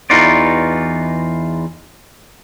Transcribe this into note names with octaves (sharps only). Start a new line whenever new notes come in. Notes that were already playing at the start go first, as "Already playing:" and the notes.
E2 E3 D#4 F4 F#4 D5